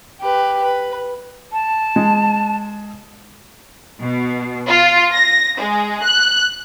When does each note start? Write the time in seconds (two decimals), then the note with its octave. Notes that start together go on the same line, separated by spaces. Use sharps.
0.21 G4 B4
0.64 B4
1.53 A5
1.96 G#3
4.01 B2
4.69 F4
5.15 A#6
5.60 G#3
6.03 F#6